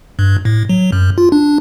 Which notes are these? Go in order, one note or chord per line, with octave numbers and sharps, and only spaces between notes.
G2
A2
F#3
F#2
F4
D4